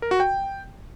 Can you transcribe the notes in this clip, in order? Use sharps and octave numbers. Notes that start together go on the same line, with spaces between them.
A#4
F#4
G5